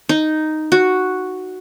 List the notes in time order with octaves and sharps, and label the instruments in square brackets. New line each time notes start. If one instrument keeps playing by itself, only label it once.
[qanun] D#4
F#4